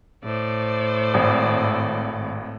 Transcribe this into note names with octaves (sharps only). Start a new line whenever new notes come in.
A2 C5 D5
G#1